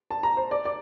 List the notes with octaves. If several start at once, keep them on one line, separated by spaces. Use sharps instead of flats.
A5
A#5
C5
D5
D5